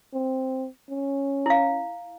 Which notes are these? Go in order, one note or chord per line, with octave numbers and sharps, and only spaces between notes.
C4
C#4
E4 F5